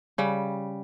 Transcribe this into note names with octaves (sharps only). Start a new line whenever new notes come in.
C#3 G3